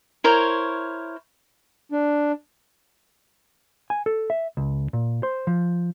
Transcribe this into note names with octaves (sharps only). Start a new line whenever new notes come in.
E4 A#4 C5 C#5
D4
G#5
A4
E5
C#2
A#2
C5
F3